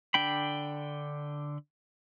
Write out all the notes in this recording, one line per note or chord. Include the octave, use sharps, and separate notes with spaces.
D3 D4 G5 B5